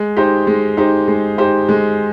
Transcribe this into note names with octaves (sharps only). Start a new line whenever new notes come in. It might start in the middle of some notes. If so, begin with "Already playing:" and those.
Already playing: G#3
D#4 G4 C5
G#3
D#4 G4 C5
G#3
D#4 G4 C5
G#3